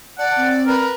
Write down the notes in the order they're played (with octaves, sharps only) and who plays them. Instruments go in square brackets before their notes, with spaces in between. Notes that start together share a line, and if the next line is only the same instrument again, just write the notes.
[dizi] D5 [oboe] F#5 [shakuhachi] A5
[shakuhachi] C4
[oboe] A#4 [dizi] B4